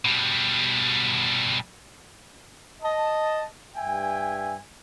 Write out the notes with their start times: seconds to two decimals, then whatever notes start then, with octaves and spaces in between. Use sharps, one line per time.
0.05 B2 G3
2.82 D#5 A5
3.76 G2 E5 G5 G#5